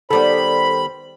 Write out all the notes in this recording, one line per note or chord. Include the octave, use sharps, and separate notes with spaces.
D#3 G3 B3 A4 C5 B5